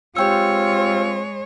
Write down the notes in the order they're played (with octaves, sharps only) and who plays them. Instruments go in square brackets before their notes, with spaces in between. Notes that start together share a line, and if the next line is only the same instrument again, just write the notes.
[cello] G#3 C#5 [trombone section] C4 F4 [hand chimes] G4 G5 E6